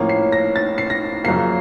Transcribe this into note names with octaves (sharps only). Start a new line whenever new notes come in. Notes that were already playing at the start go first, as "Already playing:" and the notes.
Already playing: A2 F3 A#3 C#4
C7
A#6
A6
C7
A#6
F#2 C#3 F3 A#3 C7